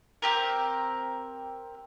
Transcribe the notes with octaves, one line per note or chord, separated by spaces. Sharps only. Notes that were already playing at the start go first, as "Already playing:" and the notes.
C4 G4 A#4